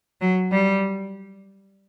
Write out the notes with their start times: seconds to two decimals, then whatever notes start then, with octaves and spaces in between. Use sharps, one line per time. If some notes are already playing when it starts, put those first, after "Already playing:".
0.21 F#3
0.51 G3